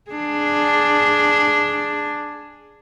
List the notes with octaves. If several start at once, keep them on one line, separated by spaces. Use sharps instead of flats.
D4 G#4